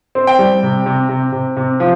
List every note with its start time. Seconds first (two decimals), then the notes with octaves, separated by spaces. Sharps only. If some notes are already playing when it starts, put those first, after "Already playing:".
0.15 C4
0.27 G5
0.39 G3
0.63 C3
0.86 C3
1.09 C3
1.32 C3
1.57 C3
1.80 F3